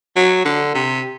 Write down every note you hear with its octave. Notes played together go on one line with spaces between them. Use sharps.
F#3
D3
C3